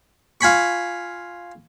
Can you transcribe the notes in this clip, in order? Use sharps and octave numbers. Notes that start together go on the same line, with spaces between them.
F4 G#5 B5 C#6